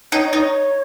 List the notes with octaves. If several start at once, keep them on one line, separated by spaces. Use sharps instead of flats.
D#4 C#5
D#5
D#4
C#5